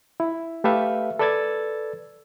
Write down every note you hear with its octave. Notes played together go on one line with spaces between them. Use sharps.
E4
A3 G4 A4 B4 E5 F5
A4 B4 D5 E6 G#6 A6